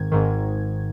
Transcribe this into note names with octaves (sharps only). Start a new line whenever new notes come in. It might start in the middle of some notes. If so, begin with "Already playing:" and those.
Already playing: G#1 G#2 D#3 G#6
G#1 G#2 D#3